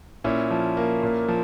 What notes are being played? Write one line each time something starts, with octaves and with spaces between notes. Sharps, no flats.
A#2 C#4 E4
F3
A#3
A#2
F3